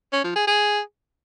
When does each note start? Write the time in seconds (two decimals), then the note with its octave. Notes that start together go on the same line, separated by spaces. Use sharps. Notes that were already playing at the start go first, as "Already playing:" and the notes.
0.12 C#4
0.24 F3
0.36 G#4
0.47 G#4